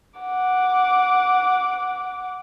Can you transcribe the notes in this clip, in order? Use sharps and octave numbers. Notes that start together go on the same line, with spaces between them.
F#5 D6